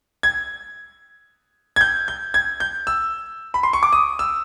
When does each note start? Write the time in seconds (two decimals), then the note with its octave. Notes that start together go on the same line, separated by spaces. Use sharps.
0.23 G#6
1.76 G#6
1.81 G6
2.08 G6
2.34 G#6
2.60 G6
2.87 E6
3.54 B5
3.63 C6
3.73 C#6
3.83 D6
3.93 D#6
4.19 E6